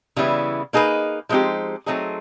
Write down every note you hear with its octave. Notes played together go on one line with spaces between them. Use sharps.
C#3 E3 G3 B3 E4
A#3 D#4 G#4 B4
F3 G#3 C4 D#4 G4
F#3 A3 C4 D#4 G#4